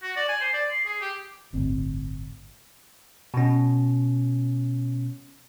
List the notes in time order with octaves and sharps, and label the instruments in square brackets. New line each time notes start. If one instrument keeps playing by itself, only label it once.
[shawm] F#4
D5
G#5
C5
D5
C6
G#4
G4
[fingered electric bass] D1 G1 D2 C4
[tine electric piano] B2 C#4